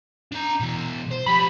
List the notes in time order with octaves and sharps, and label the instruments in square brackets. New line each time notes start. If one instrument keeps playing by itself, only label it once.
[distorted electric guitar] D4 A#5
B2 E3
C5
[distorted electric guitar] F3 G4 [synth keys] B5